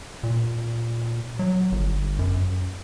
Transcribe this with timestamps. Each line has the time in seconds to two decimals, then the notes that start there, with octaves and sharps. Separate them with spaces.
0.23 A#2
1.39 F#3
1.72 G1
2.19 F#2